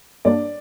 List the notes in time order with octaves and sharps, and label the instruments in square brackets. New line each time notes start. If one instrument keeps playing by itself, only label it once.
[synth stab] G2 G3 A#3 D4 [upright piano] D5